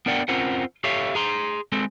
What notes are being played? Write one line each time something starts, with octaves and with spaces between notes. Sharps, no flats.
B3 D4 A#4 D5 F#5 G5
C4 C#4 F4 A#4 C5 F#5
G4 A4 C#5 E5 F5
G#4 A#5 C6
G#3 C4 A4